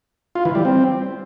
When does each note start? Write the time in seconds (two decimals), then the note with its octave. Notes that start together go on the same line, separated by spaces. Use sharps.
0.35 F4
0.45 E3
0.55 G3
0.65 C4